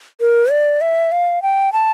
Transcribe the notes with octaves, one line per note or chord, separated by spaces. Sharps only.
A#4
D5
E5
F5
G5
A5